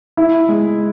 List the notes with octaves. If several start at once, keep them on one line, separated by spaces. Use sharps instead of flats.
E4
G#3